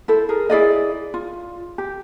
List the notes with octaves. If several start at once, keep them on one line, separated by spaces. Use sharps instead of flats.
E4 A4 C5
G#4 A#4
E4 G#4 D5 D#5
F4
G4